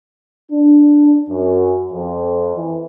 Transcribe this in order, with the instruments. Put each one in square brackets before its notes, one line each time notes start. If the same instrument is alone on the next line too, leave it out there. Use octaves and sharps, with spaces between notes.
[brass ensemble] D4
F#2
F2
E3